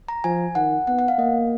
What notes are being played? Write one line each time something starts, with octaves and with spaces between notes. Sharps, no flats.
A#5
F3 G#5
D#3 F#5
B3 F#5
F#5
F5
A#3 D#5